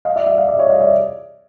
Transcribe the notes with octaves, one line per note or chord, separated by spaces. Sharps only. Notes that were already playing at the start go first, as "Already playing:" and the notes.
D#5 F5
D5 E5
D5 E5
D#5 F5
D5 E5
C#5 D#5
D#5 F5
D5 E5